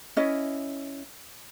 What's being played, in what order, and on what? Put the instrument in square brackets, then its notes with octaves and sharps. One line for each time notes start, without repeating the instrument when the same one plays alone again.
[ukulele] C#4 E4 D#5